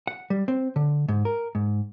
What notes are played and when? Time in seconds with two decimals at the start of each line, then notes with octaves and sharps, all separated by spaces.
0.07 F#5
0.30 G3
0.48 C4
0.76 D3
1.08 G#2
1.25 A#4
1.55 G#2